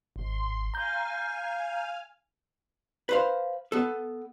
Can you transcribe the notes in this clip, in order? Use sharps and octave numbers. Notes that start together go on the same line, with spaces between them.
G#1 C6
F5 G#5 A#5 F6 G6
B4 C5 F5
B3 A4